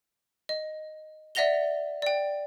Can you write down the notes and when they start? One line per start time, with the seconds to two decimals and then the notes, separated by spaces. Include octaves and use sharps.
0.49 D#5
1.35 D5 E5 F#5 A#6 F7 G7
2.02 D5 G5